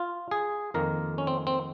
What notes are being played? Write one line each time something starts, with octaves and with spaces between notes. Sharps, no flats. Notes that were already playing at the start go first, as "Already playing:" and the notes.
Already playing: F4
G#4
F2 D#3 A#3 A#4
C#4
C4
C4